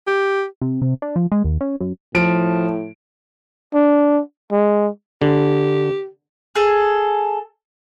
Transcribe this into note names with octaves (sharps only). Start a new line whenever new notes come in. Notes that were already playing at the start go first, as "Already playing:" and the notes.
G4
C3
C3
D4
F3
G#3
D#2
C#4
F#2
A2 F3 D7
D4
G#3
D3 G4
G#4 A4